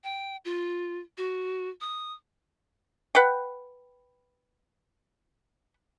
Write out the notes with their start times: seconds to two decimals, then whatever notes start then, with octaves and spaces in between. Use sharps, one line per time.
0.04 G5
0.45 F4
1.17 F#4
1.81 D#6
3.15 B4 F#5 G5